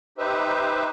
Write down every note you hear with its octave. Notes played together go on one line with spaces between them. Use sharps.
D#4 G4 B4 C5 E5